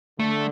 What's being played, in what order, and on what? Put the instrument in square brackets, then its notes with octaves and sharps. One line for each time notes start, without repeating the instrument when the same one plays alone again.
[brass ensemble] D3 [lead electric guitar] A3